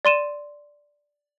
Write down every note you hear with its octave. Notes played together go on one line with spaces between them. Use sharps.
D5 C6 D#7 E7